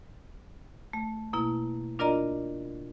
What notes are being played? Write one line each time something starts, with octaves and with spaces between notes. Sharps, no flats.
A3
B2 A#3 E4
D4 F4 A#4 D5 D#5 A#5